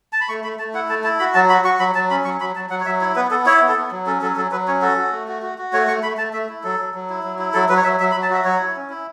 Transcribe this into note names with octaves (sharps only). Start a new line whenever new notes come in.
A5
B5
A3 C#6
A3 B5
A3 A5
E4 F#5
A3 A5
E4 A5
F#4 B5
F#3 A5
F#4 B5
F#4 C#6
F#3 B5
F#3 A5
C#4 B5
F#3 C#6
F#3 B5
F#3 A5
F#3 F#5
C#5
F#3 E5
E4 C#5
B3 B4
B3 A4
E4 C#5
B3
A4
B3
F#3
C#4 A4
F#3 A4
F#3 A4
F#3 B4
C#4 C#5
F#4 A4
F#4
A3
F#4
F#4
F#4
A3 C#5
A3 C#6
A3 B5
A3 A5
A3 E5
E4
F#3 A4
F#3
F#3
E4
F#3
E4
F#3 A4
F#3 B4
C#5
F#3 E5
F#3 E5
B5
F#3
A5
F#4 E5
F#3 C#5
E4
C#4
E4